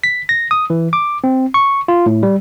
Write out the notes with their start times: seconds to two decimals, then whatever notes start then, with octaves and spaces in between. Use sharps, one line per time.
0.04 B6
0.29 A#6
0.51 D#6
0.70 E3
0.93 D6
1.24 C4
1.54 C#6
1.88 F4
2.06 A2
2.23 G3